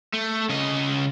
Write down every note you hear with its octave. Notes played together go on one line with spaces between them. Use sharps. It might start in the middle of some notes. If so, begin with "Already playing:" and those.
A3
C#3 D#5